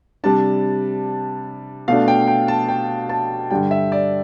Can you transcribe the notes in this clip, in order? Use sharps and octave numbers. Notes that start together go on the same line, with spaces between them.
C3 G3 D4 A5
B2 A3 D4 F5
G5
G5
A5
G5
A5
G2 D3 G3 G5
E5
D5